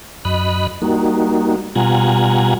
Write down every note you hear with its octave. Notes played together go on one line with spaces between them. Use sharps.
F#2 D#5 B5 F#6
G3 A#3 D#4 F#4
B2 G3 F4 F#5 G#5 A#5